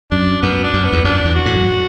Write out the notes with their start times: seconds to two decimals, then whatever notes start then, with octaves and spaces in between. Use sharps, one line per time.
0.11 F#2 D4
0.42 F#2 B3
0.64 D4
0.74 F#2
0.84 B3
0.93 E2
1.04 F#2 D4
1.25 E2
1.35 F#4
1.46 A2
1.56 F#2